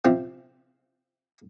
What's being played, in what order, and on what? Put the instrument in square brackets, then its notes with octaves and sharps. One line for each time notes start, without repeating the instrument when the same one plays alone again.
[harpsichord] C3 F3 C4 F4